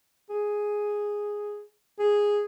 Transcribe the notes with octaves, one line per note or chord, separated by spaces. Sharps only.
G#4
G#4